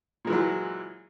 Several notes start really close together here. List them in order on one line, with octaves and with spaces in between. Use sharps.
A#2 G#3 E3 F#3